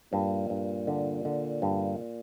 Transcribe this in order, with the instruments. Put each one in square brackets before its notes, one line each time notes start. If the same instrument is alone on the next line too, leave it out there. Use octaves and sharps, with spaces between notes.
[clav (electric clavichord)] G2 [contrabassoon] A#2
[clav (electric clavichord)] G2
D3
D3
G2